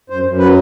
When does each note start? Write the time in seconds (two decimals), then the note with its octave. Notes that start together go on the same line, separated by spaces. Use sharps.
0.10 F#2 C5
0.24 F#2
0.39 F#3 B4